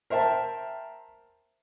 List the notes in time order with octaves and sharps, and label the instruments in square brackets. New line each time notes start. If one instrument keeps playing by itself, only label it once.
[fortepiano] A#4 C5 E5 G5 A5